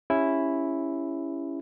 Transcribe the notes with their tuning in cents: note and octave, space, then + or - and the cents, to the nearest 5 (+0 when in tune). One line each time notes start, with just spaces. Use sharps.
C#4 +0 E4 +0 G4 +35